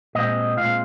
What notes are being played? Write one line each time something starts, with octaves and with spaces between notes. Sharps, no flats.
A#2 G#3 C4 D#5
A#2 G#3 C4 F4 F5